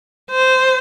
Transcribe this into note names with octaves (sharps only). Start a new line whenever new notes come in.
C5